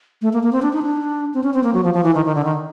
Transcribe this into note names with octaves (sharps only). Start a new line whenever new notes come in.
A3
A#3
A#3
C4
D4
D#4
D4
C4
C#4
C4
A#3
F#3
F3
F3
E3
D#3
D#3
D3
D#3